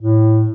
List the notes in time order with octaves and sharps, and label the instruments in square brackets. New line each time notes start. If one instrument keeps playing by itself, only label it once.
[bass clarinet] A2